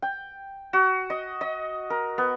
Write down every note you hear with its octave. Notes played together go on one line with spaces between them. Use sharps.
G5
F#4
D#5
D#5
A#4
B3